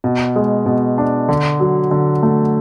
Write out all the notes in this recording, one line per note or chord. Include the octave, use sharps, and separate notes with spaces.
B2
G#3
B2
D4
D3
F#3
D3
A3